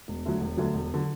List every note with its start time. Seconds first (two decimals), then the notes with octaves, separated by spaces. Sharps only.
0.08 E1
0.25 D2 D3 F#3
0.41 E1
0.57 D2 D3 F#3
0.74 E1
0.94 D3 F#3